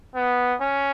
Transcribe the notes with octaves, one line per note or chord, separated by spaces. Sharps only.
B3
C#4